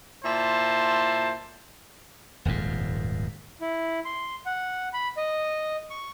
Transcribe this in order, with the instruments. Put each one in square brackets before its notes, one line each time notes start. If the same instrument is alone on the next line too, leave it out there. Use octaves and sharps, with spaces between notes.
[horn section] A#2 E4 C5 A5
[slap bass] D#1 G#1 F2 G#2
[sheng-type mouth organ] E4
C6
F#5
B5
D#5
C#6